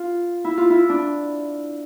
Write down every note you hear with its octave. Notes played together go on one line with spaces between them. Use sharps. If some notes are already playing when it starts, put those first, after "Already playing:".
Already playing: F4
E4
F4
E4
D4